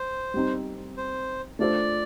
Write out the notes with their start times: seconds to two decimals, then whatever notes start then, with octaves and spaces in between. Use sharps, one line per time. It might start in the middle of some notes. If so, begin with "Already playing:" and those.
Already playing: C5
0.34 G3 C4 D#4
0.97 C5
1.59 A3 D4 F4 A4 C5 D5